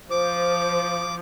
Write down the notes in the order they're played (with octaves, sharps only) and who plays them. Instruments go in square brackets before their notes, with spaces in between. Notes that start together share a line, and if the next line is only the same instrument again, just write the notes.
[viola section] F3 [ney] C5 [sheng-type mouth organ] D6